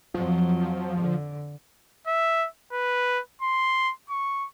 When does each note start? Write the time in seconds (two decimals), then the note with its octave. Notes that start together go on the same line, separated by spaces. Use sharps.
0.14 F2 F3 F#3
1.00 D3
2.07 E5
2.73 B4
3.42 C6
4.10 C#6